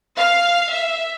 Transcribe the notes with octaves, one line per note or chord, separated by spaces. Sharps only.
F5
E5